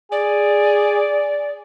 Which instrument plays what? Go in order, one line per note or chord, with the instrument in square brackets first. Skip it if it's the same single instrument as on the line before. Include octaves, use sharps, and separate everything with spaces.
[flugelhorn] G#4 [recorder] D5